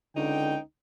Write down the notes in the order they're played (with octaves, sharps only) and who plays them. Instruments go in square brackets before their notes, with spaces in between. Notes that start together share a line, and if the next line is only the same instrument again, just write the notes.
[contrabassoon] C#2 [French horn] D3 [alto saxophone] D#4 [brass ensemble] G5